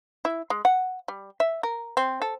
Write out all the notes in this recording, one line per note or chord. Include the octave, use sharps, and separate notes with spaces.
E4
G#3
F#5
G3
E5
A#4
C4
A4